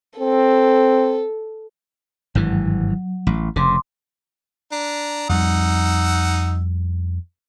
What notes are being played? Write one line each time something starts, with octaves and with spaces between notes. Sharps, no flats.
C4 A4
G#1 G2 E3 F#3
A1
F1 C#3 C6 D6
D4 A#5
F2 G3 D#4 F#5 E6